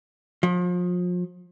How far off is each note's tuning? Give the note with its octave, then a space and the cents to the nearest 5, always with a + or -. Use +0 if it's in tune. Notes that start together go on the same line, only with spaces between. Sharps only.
F3 +35